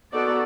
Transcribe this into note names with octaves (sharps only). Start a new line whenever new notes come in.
B3 D#4 F#4 A4 D5